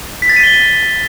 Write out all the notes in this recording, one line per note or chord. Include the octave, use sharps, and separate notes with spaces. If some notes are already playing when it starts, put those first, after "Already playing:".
B6
A6
D#7
G7